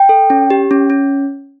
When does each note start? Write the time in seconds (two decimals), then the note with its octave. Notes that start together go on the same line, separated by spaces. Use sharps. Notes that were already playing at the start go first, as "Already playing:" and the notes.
Already playing: G5
0.09 A4
0.30 C#4
0.50 G4
0.71 C#4
0.90 C#4